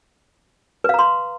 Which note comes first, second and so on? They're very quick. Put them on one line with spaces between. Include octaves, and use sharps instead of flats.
B4 F5 A#5 C6